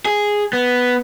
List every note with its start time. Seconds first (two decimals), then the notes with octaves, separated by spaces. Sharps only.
0.06 G#4
0.53 B3